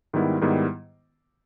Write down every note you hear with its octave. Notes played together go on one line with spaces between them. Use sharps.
G#2 D#3 G3 B3 E4
G#2 D#3 G3 B3 E4